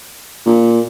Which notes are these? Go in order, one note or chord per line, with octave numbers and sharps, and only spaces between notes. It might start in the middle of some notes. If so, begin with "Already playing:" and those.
A#2